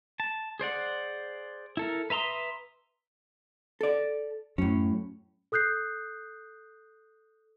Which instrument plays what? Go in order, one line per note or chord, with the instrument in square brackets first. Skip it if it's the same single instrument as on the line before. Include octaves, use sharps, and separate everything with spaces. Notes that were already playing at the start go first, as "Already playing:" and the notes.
[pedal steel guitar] A5
G#4 C5 D5 F#5
E4 A4 A#4
B4 E5 A#5 C6 D#6
[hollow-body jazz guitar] A4 D5
[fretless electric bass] F#2 F#3 [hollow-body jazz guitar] A2 C#4
[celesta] A4 D#6 F#6 G6 C7